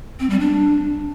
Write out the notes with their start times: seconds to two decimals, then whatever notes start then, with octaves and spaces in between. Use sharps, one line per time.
0.20 C4
0.30 G3
0.40 D4